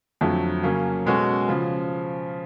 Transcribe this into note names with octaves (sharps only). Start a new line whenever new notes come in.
F2 D3 F#3 A3
C#3 F#3 A#3 C#4
B2 G#3 C#4 F#4 A4
C#3 F3